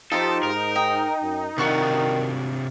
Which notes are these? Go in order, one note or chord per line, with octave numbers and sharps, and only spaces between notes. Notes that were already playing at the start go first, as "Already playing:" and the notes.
F3 D#4 F4 G4 A4 C5
G#2 A#4
D#5 G5
F#2
C3 D#3 D4 F4 F#4 C#6 F#6